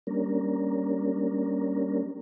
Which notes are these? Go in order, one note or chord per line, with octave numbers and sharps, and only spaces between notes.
G3 A#3 C#4 D4 A#4